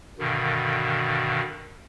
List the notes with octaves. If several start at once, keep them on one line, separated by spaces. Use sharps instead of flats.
G2 B2 D3 D#3